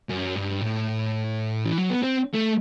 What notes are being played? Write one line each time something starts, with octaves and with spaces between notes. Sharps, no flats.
F#2
G2
A2
E3
F#3
B3
C4
A3